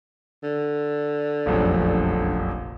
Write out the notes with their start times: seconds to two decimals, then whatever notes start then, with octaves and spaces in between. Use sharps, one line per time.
0.43 D3
1.46 F1 A#1 F#2